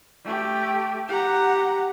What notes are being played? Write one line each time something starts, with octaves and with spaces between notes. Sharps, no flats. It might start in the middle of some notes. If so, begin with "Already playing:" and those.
A3 G4
G4 F#5 A#5